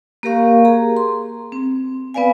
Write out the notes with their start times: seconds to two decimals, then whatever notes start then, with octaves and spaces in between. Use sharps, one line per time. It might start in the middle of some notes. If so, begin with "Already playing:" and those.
0.23 A#3 G4 A#4 F5 C#6
0.65 G#4 A#5
0.97 C6
1.52 C4
2.14 B3 B4 D5 F5 G#5